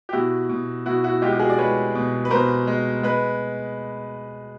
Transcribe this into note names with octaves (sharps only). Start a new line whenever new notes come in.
G4
B2 E4 F#4
B2
B2 E4 F#4
E4 F#4
G#3 F4 G4
G4
F#4 G#4
D5
G#3 B4 C#5
B2
B4
B2 A#4 C5
G#3
G#3 B4